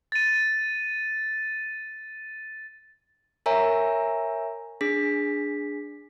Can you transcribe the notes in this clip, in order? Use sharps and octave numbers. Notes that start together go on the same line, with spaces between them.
A6 D#7
A#4 C#5 E5 G#5 A#5
D4 G#4 B6